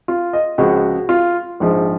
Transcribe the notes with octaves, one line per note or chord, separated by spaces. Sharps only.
F4
D#5
C#2 C#3 F3 F#4
F4
A#1 G#2 F3